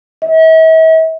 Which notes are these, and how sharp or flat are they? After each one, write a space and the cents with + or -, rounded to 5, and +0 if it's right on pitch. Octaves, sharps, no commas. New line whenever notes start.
E5 -45